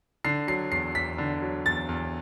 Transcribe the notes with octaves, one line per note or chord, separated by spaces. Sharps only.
D3 C7
F#3 C7
E2 C7
E2 B6
D3
F#3
E2 A6
E2